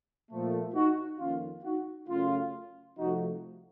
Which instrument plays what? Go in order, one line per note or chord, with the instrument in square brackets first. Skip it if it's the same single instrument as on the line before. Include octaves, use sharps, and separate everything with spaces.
[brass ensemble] A#2 F3 A3
D#4 F#4
F2 D#3 A#3 C#4 F4
D#4 F#4
F#2 C#3 A3 C#4 F4
C2 C3 F3 A3 D#4 F#4